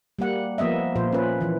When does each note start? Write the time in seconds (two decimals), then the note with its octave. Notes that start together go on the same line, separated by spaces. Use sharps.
0.19 G3 A#3 F#5
0.58 F3 A#3 B3 D#5 E5
0.96 A#2 F3 C5
1.12 C#4 B4
1.41 E3 F3